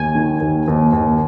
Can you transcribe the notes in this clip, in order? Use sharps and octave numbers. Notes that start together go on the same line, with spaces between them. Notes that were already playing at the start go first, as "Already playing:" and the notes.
Already playing: D#2 G#5
D#3
D#2
D#2
D#2